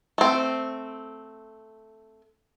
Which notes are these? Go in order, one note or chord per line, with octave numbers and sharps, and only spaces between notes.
A3 C4